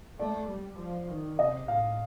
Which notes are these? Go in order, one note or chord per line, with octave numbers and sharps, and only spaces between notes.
A3 D5
G3
F3
D#3
C3 D#5
A2 F5